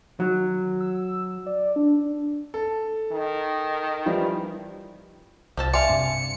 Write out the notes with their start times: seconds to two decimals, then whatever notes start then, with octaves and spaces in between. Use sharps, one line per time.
0.20 D#3 F#3
0.80 E6
1.46 D5
1.76 D4
2.54 A4
3.12 D#3
4.06 E3 F3 G3
5.57 C2 F3 A4 A5
5.74 D5 E5 F5 G#5 C6 C#7
5.89 G2 C3